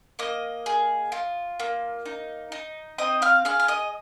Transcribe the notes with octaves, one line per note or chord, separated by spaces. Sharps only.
A#3 D#5 D#6
G#4
F4
A#3
D#4
D#4
C4 D#5 D#6
F5 F6
G#4 F5 F6
F6
D#5 D#6